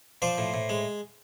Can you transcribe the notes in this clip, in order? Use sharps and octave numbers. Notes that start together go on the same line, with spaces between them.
F3 C5 D5
A2
A2
G#3